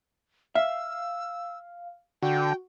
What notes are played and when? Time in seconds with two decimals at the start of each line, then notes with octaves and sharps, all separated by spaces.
0.55 E5 F5 E6
2.23 D3 F#4 G5